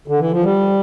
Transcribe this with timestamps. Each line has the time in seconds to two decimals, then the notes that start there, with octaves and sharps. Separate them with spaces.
0.08 D3
0.20 E3
0.32 F3
0.44 G3